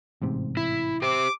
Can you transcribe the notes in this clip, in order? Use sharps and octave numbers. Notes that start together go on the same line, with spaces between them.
A1 G#2 C3
E4
G4 C5 D6